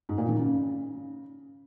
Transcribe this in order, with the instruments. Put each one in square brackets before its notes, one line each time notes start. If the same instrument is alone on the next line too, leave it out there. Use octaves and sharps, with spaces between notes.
[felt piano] G#2
A#2
D#3
C#3